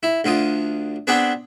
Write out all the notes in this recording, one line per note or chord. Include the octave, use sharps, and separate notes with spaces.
E4
D2 D3 F4 D#6
B3 C4 D4 G#4 B4